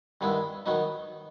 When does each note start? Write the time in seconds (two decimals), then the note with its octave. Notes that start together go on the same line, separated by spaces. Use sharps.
0.21 G2 D#3 G#3 B3 E4
0.66 D#3 F#3 B3 D#4